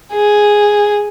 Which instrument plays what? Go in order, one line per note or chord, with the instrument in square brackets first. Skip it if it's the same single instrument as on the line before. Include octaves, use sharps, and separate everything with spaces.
[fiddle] G#4